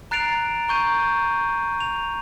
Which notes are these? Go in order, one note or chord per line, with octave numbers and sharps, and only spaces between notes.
A#5 F#6 A6 C7 D7 F7
A#5 C#6 G6 D#7
F7